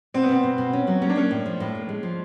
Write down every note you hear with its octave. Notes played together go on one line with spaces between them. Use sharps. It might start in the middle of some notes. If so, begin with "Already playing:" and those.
B2 C4
B3
B2 C4
B2
B2
C#4
F#3
A#3 C#4
D4
A#3 C#4
A2
F3
A2
A#3
G#3
F3